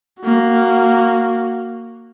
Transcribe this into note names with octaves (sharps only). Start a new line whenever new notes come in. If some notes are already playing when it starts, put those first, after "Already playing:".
A#3 F#4